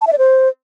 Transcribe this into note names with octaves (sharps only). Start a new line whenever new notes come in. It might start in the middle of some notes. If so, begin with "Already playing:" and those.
A5
E5
D5
C5